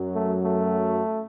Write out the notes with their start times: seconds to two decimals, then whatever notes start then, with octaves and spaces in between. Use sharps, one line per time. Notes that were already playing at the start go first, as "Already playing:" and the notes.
Already playing: F#2 F#3
0.15 A3
0.44 A3